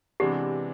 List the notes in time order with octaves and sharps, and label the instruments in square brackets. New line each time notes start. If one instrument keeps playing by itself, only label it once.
[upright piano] C3 E3 G#3 B3 D4 [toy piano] G4